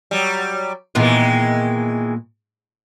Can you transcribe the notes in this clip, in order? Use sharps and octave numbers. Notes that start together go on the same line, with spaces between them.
F#3 G3
A#2 D#3 E3 G#3 B3 F4